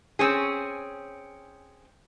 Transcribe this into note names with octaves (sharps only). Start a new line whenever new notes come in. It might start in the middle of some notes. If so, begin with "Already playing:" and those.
C4 C#4 G#4